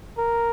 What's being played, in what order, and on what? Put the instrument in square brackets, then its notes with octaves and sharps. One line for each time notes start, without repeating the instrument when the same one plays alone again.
[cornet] A#4